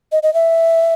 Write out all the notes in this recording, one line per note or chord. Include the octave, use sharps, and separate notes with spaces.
D#5
D#5
E5